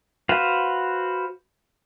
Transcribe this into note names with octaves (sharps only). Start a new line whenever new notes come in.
F#4 B4 C5 F5 F#5